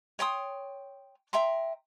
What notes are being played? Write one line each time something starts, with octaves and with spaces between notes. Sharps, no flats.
C#5 G5 C6 D#6
E5 G5 A#5 C6